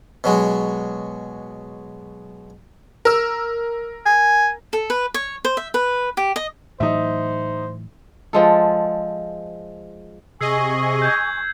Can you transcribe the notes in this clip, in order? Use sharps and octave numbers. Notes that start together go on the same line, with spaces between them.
B2 F#3 G#3
A#4 E6
G#5
A4
B4
C#5
C5
E5
B4
G4
D#5
A2 E3 F#3 D#4 C5 E5
F3 G#3 A4
C3 G#4 D#5 G#5 C#6 E6 C7
G6 G#6